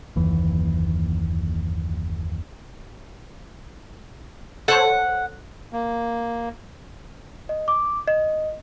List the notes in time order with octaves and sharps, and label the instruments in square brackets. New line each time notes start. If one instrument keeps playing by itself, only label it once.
[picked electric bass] F#1 D#2 E3
[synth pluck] A4 C5 C#5 [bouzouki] F#5
[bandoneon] A#3
[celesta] D#5
D6
D#5